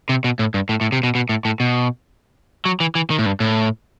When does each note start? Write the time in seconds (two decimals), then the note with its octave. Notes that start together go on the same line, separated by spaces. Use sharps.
0.09 C3
0.24 B2
0.39 A2
0.54 G2
0.69 A2
0.81 A2
0.92 C3
1.03 B2
1.15 B2
1.29 A2
1.45 A2
1.60 B2
2.65 F#3
2.80 E3
2.95 E3
3.10 D#3
3.19 A2
3.26 G2
3.40 A2